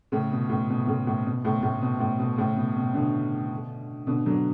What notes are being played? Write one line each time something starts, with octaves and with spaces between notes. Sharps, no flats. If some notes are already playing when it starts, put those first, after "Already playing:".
A2 C#3
B2
A2
B2
A2 C#3
A2
B2
A2 C#3
A2 C#3
B2
A2
B2
A2 C#3
B2
B2
B2 D3
B2 D3
D3 F#3